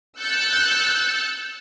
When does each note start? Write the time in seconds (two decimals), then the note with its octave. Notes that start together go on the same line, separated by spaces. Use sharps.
0.20 E6 F#6 G6 A6 C#7